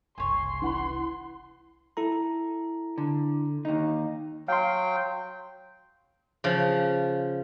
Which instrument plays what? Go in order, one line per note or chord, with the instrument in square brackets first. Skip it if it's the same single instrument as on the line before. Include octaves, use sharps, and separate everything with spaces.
[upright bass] F#1 C2 [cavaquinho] C#5 G#5 [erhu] C6
[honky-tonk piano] E3 F#5 B5
[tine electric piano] E4 A4 A#5
[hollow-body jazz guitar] D3
D#2 D#4
[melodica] F#3 G5 [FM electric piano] F5 C6
[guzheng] C#3 F3